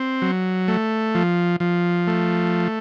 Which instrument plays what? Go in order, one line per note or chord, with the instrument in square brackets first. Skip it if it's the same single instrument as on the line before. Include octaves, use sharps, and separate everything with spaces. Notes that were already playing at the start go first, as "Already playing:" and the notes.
Already playing: [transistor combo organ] C4
F#3
A3
F3
F3
A3